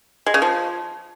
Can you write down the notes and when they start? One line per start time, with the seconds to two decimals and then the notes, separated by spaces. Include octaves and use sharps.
0.26 G#3
0.34 C#3
0.42 F3